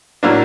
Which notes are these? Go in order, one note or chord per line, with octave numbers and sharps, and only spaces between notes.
A2 F#3 A#3 D4